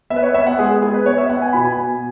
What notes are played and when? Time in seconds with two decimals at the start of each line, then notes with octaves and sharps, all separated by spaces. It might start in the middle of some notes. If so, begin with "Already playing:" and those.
0.10 B3 E5
0.16 B4
0.23 C#5
0.34 B3 E5
0.47 F#5
0.58 G#3 G#4
0.71 G#4
0.82 B3 G#4
0.94 B4
1.06 B3 C#5
1.18 E5
1.29 B3 F#5
1.42 G#5
1.53 B2 B5
1.64 G#5
1.77 B3